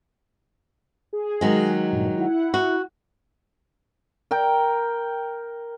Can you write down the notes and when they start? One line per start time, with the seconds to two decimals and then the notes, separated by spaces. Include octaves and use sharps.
1.13 G#4
1.41 D#3 F#3 G#3
1.92 G2 A#2
2.17 E4 F#5
2.54 F#4
4.31 A#4 G5